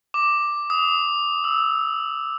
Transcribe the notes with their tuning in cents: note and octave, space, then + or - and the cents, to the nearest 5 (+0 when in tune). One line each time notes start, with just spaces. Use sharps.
D6 +5
D#6 +25
E6 -5